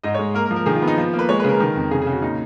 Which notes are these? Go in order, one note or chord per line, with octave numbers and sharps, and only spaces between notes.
G#2 D#5
C#5
G#3
A#3 A#4
A#4
F3
A#4
D#3 G#4
F4
B3
D#4
F3 F4
A#3
B4
G#3 C#5
B4
C#3 G#4 A#4
D#3
F2
C#3 G#4
G#4
C#3
F#4
A#2 D#4